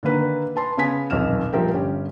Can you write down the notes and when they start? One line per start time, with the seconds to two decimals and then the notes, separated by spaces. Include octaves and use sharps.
0.03 D3 D#3 A#3 B4
0.56 B4 A5 C6
0.77 C#3 B3 G#5 B6
1.10 D#1 B1 F2 F6 E7
1.53 A#2 F3 G3 A#4 E5 G5
1.73 G1 C#4 G4